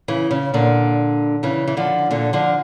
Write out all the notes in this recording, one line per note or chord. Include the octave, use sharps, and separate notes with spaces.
C#3 E3
C#3
A#2 D3
C#3 E3
E3
D3 F3
A#2 D3
D3 F3